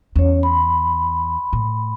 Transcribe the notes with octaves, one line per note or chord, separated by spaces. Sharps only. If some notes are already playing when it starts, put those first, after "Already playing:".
E2 C#4 C#5
B5 C6
A2